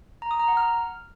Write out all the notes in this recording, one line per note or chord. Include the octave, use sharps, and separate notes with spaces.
A#5
D#6
A#5
F#5
F6